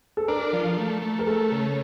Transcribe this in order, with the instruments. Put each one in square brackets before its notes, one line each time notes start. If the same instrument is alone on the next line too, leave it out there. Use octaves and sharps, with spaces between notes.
[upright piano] A4
[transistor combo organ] D4 [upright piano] A#4
[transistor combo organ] F3
A3
A3
[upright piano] A#4
[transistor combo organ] A3 [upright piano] A4
[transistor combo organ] C#3